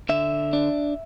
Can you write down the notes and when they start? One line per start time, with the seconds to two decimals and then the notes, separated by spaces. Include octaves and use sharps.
0.09 D3 E5
0.53 D4